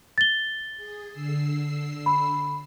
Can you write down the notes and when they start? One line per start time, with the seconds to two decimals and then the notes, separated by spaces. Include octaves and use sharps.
0.18 A6 G7
0.77 G#4
1.11 D3 E6 C7
2.06 B5